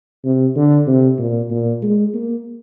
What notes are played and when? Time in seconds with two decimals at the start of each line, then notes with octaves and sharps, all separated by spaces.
0.24 C3
0.56 D3
0.87 C3
1.19 A#2
1.51 A#2
1.83 G#3
2.14 A#3